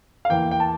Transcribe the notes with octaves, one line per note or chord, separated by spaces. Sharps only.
F5
E2 E3 A#3 G5
G5
A5